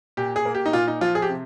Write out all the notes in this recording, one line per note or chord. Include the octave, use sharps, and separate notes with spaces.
A#2 G4
G#4
A#3
G4
D#4
A#2 F4
D#4
F3 F4
G#4
G4
C3